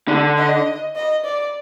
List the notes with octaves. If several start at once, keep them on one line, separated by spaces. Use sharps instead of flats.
D3
D#5
D#5
D5